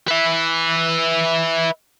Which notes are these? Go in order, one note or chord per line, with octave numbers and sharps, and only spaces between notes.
B4 E5